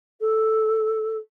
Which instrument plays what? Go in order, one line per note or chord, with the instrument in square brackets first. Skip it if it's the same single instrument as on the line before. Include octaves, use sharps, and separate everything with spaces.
[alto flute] A4